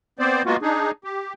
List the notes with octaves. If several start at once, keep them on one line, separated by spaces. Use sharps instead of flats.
B3 C4 C5 D5
G#3 A#3 B3 F4 F#4
D4 D#4 G#4
G4